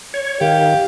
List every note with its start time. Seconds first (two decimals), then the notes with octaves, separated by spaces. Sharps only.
0.14 C#5
0.41 D#3 G4 F5